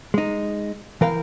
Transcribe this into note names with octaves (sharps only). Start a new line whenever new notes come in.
G#3 D#4
E3 A#4 F5 G5